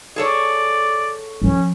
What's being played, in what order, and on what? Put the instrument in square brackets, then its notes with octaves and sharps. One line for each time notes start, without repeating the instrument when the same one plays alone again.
[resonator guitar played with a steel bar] G#4 A4 C#5 [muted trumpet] D5
[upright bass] F3 [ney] C#4